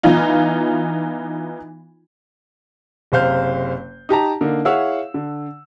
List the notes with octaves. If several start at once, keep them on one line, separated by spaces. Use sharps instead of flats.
E3 B3 D#4 F4
F#1 C3 C5 F5 G6
D#4 G4 A5 A#5
D3 A#3 D#4
E4 G#4 C#5 F5 F#5 E6
D3